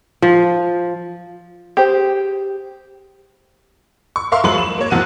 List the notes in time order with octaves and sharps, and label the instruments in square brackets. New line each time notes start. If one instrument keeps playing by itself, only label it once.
[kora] F3
[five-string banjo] G4 G#4 C5
[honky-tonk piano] C#6
A#4 E5 F5 C6 C#6
F3 F#3 G#3 B5 C#6 F#7
E7
A#3 C#5
F#1 E2 F3 F#3 F#5 D#7